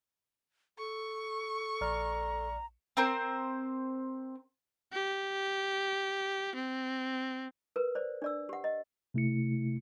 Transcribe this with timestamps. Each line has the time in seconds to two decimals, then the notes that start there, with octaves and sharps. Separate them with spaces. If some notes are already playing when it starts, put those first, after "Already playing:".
0.78 A4 C#6
1.81 A#1 D5 A#5 F6
2.97 C4 A#4 C5
4.93 G4
6.55 C4
7.76 A#4 B4
7.95 C5 D5
8.22 D4 D5 E6
8.49 G4 F#5
8.64 D#5
9.14 C3 A3 E4 C#7